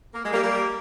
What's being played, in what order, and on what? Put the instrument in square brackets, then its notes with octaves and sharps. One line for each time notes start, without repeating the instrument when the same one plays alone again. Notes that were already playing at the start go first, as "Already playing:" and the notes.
[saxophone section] A#3
G#3
G3 A#3
G3 A#3